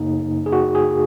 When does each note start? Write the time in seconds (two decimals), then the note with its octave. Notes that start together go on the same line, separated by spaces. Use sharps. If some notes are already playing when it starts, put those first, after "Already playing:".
Already playing: F#2 C#3 A#3 D#4
0.46 G#4
0.53 F#4
0.75 G#4